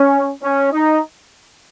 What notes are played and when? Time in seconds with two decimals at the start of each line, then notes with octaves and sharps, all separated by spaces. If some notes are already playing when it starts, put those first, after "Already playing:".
Already playing: C#4
0.43 C#4
0.72 D#4